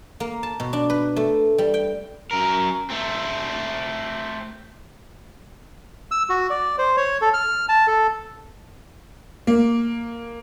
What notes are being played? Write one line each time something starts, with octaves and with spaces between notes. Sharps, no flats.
A#3
A5
B2
D4
B4
A3
G3
G5
F#2 A#4
A3 C4
E6
F#4
D5
C5
C#5
A4
F6
A5
A4
A#3